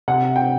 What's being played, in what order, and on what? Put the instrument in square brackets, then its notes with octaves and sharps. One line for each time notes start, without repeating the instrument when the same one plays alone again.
[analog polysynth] C3 [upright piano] F#5
[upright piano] G5